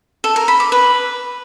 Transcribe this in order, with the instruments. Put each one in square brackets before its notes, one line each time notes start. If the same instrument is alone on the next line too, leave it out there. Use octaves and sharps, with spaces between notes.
[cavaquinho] A4
A#4
B5
D6
B4